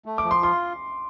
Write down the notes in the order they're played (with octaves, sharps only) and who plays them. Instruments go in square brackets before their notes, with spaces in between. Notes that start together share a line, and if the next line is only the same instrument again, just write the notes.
[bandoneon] A3
[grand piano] D6
[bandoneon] F3
[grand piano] C6
[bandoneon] F4 [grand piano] C6